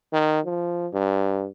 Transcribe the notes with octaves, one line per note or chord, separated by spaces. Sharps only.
D#3
F3
G2